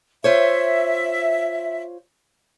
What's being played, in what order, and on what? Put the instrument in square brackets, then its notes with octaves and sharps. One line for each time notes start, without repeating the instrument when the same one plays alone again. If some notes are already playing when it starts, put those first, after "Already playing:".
[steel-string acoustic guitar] F4 C5 C#5 [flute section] E5